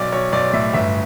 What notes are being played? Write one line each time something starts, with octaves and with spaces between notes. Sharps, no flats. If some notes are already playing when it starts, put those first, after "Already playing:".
Already playing: B1 D5
B1 C#5
B1 D5
A2 E5
G1 E5